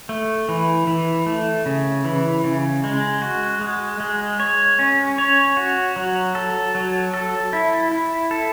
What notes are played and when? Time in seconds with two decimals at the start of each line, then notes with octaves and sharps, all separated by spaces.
0.09 A3
0.49 E3
0.87 E3
1.26 A3
1.66 C#3
2.04 E3
2.44 C#3
2.84 G#3
3.22 F#4
3.61 G#3
4.00 G#3
4.40 C#5
4.79 C#4
5.18 C#5
5.57 F#4
5.96 F#3
6.35 A4
6.75 F#3
7.14 A4
7.53 E4
7.92 E4
8.31 A4